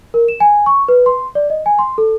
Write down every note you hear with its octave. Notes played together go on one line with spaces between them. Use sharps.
A#4
E7
G#5
C#6
B4
C6
D5
D#5
G#5
C6
A4